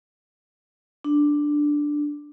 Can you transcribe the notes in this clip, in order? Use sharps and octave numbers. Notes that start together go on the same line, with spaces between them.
D4